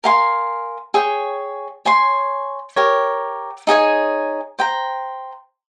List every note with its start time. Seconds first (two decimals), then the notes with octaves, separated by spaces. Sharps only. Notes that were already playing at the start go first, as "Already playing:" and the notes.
0.04 A#4 F5 G#5 C6
0.94 G#4 C#5 G5
1.85 C#5 G#5 C6
2.76 G4 A#4 C#5
3.67 D#4 G#4 C#5 G#5
4.59 C5 G5 A#5